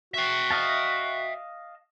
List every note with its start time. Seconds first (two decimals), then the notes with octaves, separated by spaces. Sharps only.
0.14 F#4 E5 G5
0.51 D#5 F5 A5